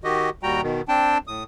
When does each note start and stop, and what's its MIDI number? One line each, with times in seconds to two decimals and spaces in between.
0.04 0.30 51
0.04 0.30 66
0.04 0.30 67
0.04 0.30 75
0.43 0.61 39
0.43 0.61 55
0.43 0.61 66
0.43 0.61 79
0.43 0.61 82
0.62 0.81 47
0.62 0.81 51
0.88 1.18 60
0.88 1.18 62
0.88 1.18 79
0.88 1.18 81
1.27 1.44 45
1.27 1.44 87